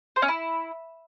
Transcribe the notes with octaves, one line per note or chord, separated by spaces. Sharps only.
C5
C#4
E4